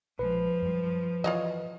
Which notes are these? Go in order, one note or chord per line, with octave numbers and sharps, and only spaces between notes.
A#1 F3 G#3 B4
F#2 G3
E3 F4 C#5 D#5